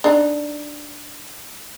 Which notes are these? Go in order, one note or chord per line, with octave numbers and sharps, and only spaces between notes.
D4 D#4